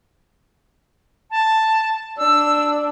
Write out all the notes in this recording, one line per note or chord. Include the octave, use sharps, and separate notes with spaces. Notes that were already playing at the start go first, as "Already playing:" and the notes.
A5
D4 E6